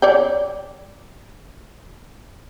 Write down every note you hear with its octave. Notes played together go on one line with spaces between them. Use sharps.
C#5 D5 G5